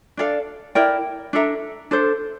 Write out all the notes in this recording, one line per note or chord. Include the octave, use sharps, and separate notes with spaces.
D4 A4 D5 F5
E4 A#4 D5 G5
D4 A4 E5 A#5
D4 A4 C5